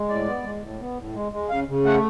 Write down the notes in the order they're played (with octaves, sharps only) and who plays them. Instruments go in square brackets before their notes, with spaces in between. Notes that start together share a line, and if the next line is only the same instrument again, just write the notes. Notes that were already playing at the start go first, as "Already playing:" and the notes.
Already playing: [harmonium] G#3
A2 D5
B3
G#3
A2
B3
A2
G#3
G#3
C#3 F5
C#3
A3 F#5